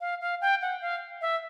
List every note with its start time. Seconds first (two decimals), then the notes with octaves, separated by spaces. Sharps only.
0.01 F5
0.21 F5
0.41 G5
0.61 F#5
0.81 F5
1.21 E5